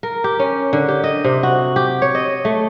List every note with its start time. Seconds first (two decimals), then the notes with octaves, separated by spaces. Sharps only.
0.03 A#4
0.24 G4
0.39 C#4
0.73 D3
0.88 G4
1.04 D#5
1.24 C3
1.43 F#4
1.76 G4
2.02 C#5
2.15 D#5
2.45 A3